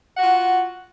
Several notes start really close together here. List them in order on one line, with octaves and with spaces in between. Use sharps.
F#5 F#4 F4